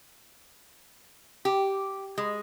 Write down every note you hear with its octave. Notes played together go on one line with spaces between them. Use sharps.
G4
G#3